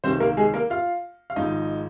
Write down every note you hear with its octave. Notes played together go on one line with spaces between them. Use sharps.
C#2 C3 D#3 C4 C5
A#3 A#4
G#3 G#4
A#3 A#4
F4 F5
F5
G#1 G#2 F3 D#4 D#5